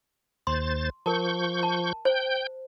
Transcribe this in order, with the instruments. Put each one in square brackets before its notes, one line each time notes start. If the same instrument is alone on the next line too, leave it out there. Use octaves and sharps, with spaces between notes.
[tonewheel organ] D#2 C5 A6 [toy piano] C6
[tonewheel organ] F3 C#6 G6 [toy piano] A#4 A5
[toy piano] A5
[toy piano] C5 [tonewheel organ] G5 G6